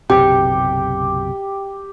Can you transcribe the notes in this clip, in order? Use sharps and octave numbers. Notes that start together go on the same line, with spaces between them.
F#1 B1 C3 G4 G5